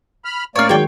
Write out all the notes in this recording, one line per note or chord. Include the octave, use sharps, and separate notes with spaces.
B5 F6
A2 A#3 C#4 C#5 D5 F6 C7
D#3 F#3 G#3 C#5 G5